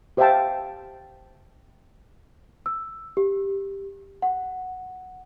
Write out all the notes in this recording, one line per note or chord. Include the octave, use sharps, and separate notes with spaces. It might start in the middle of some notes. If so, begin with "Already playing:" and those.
G4 C5 E5 F5 G5 A5
E6
G4
F#5